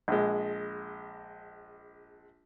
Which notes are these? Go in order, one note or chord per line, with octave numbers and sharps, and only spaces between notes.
A#1 G#3